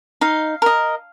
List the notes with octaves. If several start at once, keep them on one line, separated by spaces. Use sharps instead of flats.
D#4 F5
A#4 D#5